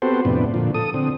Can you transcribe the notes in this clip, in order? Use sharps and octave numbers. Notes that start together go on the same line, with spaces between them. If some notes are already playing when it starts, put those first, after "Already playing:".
B3 C4 F#4 G4 A4 C5
F2 A2 C3 B3 D4
A#2 D3 F3
A4 D#6
D3 C4